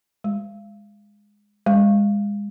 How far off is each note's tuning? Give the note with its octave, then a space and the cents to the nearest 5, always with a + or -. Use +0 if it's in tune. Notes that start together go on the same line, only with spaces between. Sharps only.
G#3 -10
G#3 -25